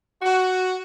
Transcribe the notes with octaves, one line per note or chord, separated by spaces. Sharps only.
F#4